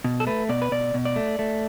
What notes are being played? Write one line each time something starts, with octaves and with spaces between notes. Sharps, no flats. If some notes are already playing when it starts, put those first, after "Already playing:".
B2
A4
A3 B4
B2 D5
B4
B2 D5
B2
D5
A3
A3